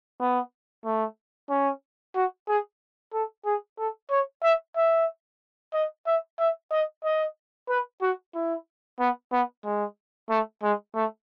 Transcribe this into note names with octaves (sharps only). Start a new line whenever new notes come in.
B3
A3
C#4
F#4
G#4
A4
G#4
A4
C#5
E5
E5
D#5
E5
E5
D#5
D#5
B4
F#4
E4
B3
B3
G#3
A3
G#3
A3